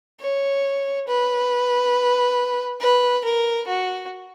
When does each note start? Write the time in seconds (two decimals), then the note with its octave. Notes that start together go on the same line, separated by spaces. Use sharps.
0.21 C#5
1.08 B4
2.81 B4
3.25 A#4
3.68 F#4